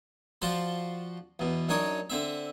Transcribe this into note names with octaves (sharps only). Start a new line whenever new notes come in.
F3 F4 F#4 C5 D5 C6
E2 B2
F#2 D4 D#4 C#5 D6 D#6
D3 C4 E5